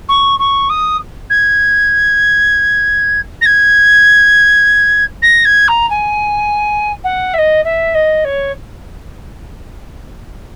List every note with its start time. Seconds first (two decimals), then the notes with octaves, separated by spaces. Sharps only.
0.09 C#6
0.39 C#6
0.70 D#6
1.30 G#6
3.41 A#6
3.46 G#6
5.22 A#6
5.45 G#6
5.68 A#5
5.90 G#5
7.04 F#5
7.34 E5
7.38 D#5
7.65 E5
7.95 D#5
8.25 C#5